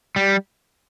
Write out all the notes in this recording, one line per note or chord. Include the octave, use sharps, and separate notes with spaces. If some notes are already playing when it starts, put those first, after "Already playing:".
G3